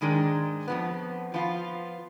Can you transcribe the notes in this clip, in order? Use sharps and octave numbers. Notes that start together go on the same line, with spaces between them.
G#2 D#3 G#3 D4
F2 F3 B3
F3 B3 F4